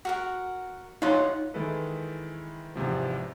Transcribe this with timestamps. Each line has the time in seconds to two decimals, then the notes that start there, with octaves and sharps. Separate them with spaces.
0.05 F#4 A#4 F#5
1.02 D#4 F4 C#5 F#5 C6
1.54 D#3 E3 G#3 E4 A4 B4
2.76 E2 G#2 C3 F3